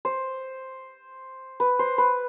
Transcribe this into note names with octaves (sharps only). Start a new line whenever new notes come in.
C5
B4
C5
B4